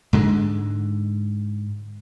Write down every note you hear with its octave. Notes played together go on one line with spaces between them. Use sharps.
G#2 D3 G#3